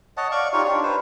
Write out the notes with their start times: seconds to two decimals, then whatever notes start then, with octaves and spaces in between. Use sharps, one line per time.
0.17 C#5 D#5 F#5 A5
0.32 D5 F5 C#6
0.53 D#4 F4 G4 C#5
0.65 D4 G4 C#5
0.83 B4 C5